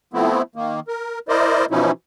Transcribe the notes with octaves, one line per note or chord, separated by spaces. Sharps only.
F3 A3 B3 C4 E4
D#3 A#3
A#4
E4 A#4 C5 D5 D#5
B2 E3 F3 C#4 D#4 E4